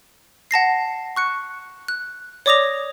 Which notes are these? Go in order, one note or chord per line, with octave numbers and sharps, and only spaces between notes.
F#5 A5 A#6 C7
C#6 F#6 C#7
F#6
C#5 D5 D6 D#6 A#6 F7